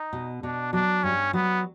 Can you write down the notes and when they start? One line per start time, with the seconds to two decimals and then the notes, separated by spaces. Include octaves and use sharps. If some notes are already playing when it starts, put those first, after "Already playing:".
Already playing: D#4
0.13 B2
0.43 B2 D4
0.73 F#3 D4
1.03 G2 C#4
1.33 F#3 B3